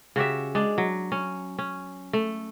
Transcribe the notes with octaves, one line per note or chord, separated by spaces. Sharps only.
C#3 F#4 G4 E5
G#3 D4
F#3
C#4
C#4
A3